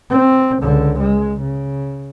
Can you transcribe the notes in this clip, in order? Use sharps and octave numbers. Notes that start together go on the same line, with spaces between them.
C4
C#2 D3
G#3
C#3